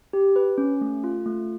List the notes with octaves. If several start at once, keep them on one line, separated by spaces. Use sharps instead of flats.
G4
B4
C#4
A3
F4
A3